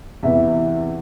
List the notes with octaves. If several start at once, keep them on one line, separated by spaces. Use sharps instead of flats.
E2 C3 E3 E5